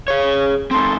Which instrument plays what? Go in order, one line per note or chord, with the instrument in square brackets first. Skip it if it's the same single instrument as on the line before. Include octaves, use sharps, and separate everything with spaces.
[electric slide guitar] G#4 C#5
[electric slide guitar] C4 D#4 [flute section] A4 C6